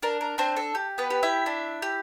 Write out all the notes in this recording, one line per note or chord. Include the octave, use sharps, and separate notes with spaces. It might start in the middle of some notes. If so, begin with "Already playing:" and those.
D4 A#4
A#4
C4 D4 C5
A4
G4
B3 B4
G4
E4 E5
D4
G4